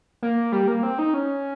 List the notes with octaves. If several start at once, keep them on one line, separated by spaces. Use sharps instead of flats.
A#3
G3
A#3
C4
D#4
C#4